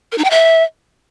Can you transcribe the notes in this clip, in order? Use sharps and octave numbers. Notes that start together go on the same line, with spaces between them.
A#4
D#4
G5
E5